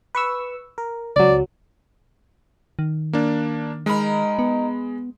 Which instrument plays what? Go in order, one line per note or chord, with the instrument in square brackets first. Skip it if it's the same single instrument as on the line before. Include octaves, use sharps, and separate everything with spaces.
[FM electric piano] B4 C#6 E6
A#4
[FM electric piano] C#2 F#3 [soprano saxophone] D5
[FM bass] D#3
[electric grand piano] A#3 D4
[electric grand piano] G#3 B5 [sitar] D#4 A#4
[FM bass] B3